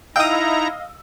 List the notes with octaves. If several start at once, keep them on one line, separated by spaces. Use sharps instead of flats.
D#4 E4 D#5 F5 G5 A#5 D#6 E6